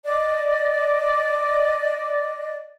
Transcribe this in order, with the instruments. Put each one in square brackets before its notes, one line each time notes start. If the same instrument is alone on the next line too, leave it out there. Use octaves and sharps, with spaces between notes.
[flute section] D5 D#5